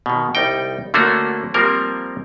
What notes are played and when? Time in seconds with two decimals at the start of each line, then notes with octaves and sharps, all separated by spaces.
0.06 B2 D#3
0.35 C2 G3 D#4 G5
0.94 D3 A3 A#3 C#4 D4 F#4
1.54 F3 G3 A#3 C4 A#4